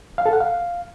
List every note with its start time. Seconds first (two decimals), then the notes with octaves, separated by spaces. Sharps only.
0.18 F5
0.26 A4
0.33 F#5
0.40 F5